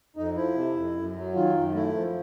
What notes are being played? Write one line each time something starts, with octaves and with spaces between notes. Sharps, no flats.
F2 D#4
F3 E4
C3
F2
F#2
F#3
D#3 F4
F#2
A3 E4
F3